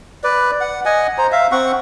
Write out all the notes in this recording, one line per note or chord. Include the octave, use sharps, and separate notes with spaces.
B4 D5
F#5
D#5 F#5 G#5
C5 A#5
E5 F5
C4 F#5 C#6